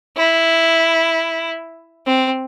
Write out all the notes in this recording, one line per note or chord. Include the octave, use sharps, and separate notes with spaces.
E4
C4